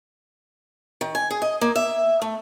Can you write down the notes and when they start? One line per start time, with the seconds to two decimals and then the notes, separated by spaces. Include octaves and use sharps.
1.01 D#3
1.15 G#5
1.30 G#4
1.42 D#5
1.61 A#3
1.76 E5
2.22 A3